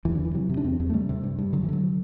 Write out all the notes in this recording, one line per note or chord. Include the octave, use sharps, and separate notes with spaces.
E2 E3
D3
E2
E3
C3 F#3
C3
D4
E2 C4
E2
A3
C3 G3
C3
G2
G2
D3 F#3
E3
D3 F#3